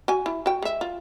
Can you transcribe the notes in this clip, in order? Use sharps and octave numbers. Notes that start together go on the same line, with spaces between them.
F#4 G#5
E4
F#4 G5
G#3 E5
F4